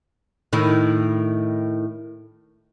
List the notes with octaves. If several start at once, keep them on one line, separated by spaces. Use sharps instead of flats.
A2 D#3 E4